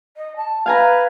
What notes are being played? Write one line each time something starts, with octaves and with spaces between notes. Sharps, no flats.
D#5
A5
B4 F5 G#5 A#5